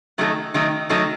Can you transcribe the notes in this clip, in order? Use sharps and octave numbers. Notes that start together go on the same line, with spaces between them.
D#3 F#3 A3 D#4 A4
D#3 F#3 A3 D#4 A4
D#3 F#3 A3 D#4 A4